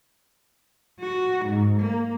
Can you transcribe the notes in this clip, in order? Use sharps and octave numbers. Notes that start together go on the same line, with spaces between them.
F#4
G#2
A#3